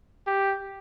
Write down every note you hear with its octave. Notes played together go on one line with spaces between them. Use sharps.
G4